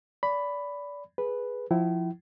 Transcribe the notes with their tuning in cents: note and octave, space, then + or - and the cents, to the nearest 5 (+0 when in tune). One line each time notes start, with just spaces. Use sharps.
D5 -25 B5 +5
G#4 +0 B4 -5
F3 +0 E4 +0 G5 -45